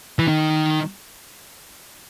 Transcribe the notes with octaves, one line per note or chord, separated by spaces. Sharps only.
E3
D#3